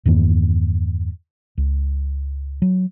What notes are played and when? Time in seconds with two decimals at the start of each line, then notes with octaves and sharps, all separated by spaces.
0.05 E2 G2 D#3 A#3
1.58 C#2
2.62 F#3